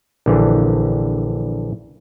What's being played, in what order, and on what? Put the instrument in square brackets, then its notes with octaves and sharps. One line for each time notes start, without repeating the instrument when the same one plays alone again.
[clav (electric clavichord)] A#1 D3 E3